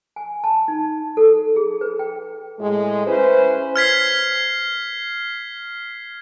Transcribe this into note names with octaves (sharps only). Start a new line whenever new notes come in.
G#5
A5
D#4
A4
G#4
B4
G5
A2 G#3
C#4 E4 B4 C5
F6 G#6 B6 C7